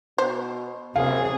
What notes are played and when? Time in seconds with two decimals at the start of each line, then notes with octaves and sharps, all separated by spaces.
0.18 B2 C5
0.96 F#1 C3 G#4 F5